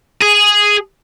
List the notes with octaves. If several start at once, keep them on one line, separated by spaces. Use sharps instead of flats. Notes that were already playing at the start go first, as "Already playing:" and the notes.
G#4